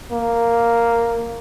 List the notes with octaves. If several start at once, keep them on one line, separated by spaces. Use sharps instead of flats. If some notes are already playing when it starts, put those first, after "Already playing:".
A#3